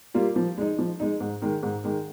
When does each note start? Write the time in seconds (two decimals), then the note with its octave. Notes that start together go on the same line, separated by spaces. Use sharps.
0.14 G3 A#3 F4
0.36 F3
0.58 G#3 D#4
0.79 F3
1.00 G#3 D#4
1.20 G#2
1.42 D#3 G#3
1.63 G#2
1.84 D#3 G#3